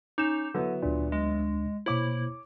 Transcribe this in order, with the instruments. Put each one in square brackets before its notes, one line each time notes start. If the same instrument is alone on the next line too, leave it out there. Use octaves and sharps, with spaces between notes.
[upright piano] C#4 E7 [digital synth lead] D#4 [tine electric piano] D6 G6
[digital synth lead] D3 [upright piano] F#3 B3 E4
[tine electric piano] D2 D4 [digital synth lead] A#2
[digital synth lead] G#3
[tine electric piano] B2 A#3 C5 [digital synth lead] E4 [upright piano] C#5 D6